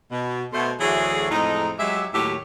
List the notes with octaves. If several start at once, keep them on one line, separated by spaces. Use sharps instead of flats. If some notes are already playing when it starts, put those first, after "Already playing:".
B2
B2 A3 C5
D2 E3 F#3 A3 G#4
F2 A2 G#3 D#4
F#3 G#3 G4 E5
D#2 A2 F#3 G4 C#5 E5